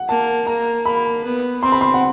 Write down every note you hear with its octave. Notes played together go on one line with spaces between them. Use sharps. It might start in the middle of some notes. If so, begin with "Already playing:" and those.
Already playing: F#5
A#3 A5
A#3 A#5
A#3 B5
B3
C4 C6
B5
C6
F#5